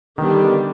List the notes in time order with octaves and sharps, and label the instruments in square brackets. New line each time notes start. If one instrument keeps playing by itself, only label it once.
[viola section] D3 G3 B3 D4 [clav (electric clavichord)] D#3